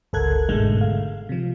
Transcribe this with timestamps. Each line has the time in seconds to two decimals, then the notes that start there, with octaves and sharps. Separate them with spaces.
0.13 G1 C#2 A4 A#4 F#6 G#6
0.49 G#2 B2 D3 G#3 A3
0.81 F5
1.29 C3 F3